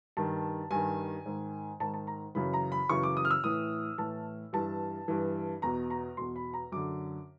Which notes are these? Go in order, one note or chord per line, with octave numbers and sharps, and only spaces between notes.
G2 D#3 A5
G2 D#3 G#5
G#2 D#3
G#2 D#3 A5
A5
A#5
F#2 C#3 E3 B5
A#5
B5
F#2 C#3 E3 C#6
D6
D#6
F6
E6
A2 E3 D#6
A2 E3 A5
G2 E3 A5
G2 E3
E2 B2 A#5
A#5
E2 B2 C6
B5
A#5
F#2 D3 D6